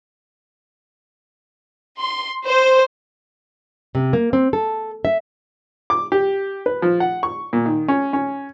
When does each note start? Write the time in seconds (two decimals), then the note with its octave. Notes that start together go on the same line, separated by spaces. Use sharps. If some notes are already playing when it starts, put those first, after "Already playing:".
1.99 C6
2.46 C5
3.95 C3
4.13 A#3
4.33 C4
4.53 A4
5.05 E5
5.90 D6
6.12 G4
6.66 B4
6.82 F3
7.00 F#5
7.23 C#6
7.53 A#2
7.66 D#3
7.88 C#4
8.13 C#4